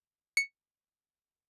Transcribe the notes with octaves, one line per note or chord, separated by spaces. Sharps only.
C#7